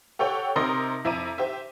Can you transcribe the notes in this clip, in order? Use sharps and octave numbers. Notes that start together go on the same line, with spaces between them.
G4 A4 C#5 F#5 G5
C3 D#4 A#4 C6 D#6 A#6
F2 E4 E5 A#5 D6 D#7
G4 C5 E5